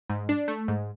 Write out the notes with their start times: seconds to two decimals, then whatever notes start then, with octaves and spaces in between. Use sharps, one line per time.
0.10 G#2
0.29 D4
0.48 A3
0.68 G#2